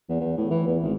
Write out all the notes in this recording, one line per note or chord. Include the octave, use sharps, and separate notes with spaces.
E2
E2
A2
E3
E2
G#1